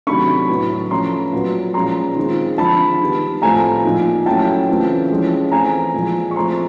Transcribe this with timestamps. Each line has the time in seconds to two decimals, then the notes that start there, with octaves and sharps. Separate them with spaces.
0.07 C3 D#3 F#3 A3 D4 B5 C#6
0.49 A2 F#3 B3 E4
0.90 F3 A3 C#4 A#5 C6
1.33 A#2 F#3 B3
1.74 A#2 F3 G#3 C#4 A#5 C6
2.16 D#3 G#3 C4 F4
2.58 D3 F3 G#3 C4 A5 B5
3.00 D#3 G3 B3
3.42 A2 F3 A3 C4 F4 G#5 A#5
3.84 A#2 F3 A#3 D#4
4.26 F#3 A3 C#4 E4 G5 A5
4.68 C#3 E3 A3 C4 F4
5.11 F3 G#3 C#4 E4
5.51 E3 A3 C4 G#5 A#5
5.94 A#2 F3 G#3
6.31 C#6
6.36 F3 A3 C4 A#5 C6